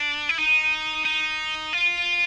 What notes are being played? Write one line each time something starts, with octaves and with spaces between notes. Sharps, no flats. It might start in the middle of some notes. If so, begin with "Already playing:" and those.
Already playing: D4
E4
D#4
D#4
F4